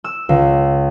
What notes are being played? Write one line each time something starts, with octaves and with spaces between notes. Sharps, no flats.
E6
C#2